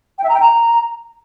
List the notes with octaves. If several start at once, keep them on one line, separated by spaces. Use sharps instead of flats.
G5
E5
A#5
G5
A#5